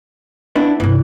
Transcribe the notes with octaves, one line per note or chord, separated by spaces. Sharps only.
B3 D4 E4
G1 C2 E3